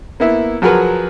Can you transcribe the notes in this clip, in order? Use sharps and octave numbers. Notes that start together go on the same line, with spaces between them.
A#3 B3 E4 E5
F3 F#3 F#4 G#4 A#4 B4